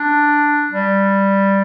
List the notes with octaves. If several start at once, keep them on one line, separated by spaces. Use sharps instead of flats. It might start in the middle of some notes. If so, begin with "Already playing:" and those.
Already playing: D4
G3